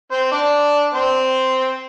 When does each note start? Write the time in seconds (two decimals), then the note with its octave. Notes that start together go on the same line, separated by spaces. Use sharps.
0.12 C4 C5
0.32 D4 D5
0.94 C4 C5